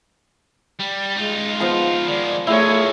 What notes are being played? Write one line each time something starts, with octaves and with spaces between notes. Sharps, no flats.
G3
G#3 D#4 F4
F3 B3 C6
D#3 G#3 D5
F3 G#3 A3 E4 G#4 C#5